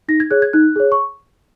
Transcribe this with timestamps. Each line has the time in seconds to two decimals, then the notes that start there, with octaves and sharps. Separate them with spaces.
0.08 D#4 A#6
0.20 G#6
0.31 G#4 C#5 F#6
0.42 G#6
0.53 D#4 F#6
0.76 G#4 C#5
0.92 C#6